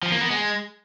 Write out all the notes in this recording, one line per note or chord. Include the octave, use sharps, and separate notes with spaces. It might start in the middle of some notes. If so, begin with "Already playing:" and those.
F3
A#3
B3
G#3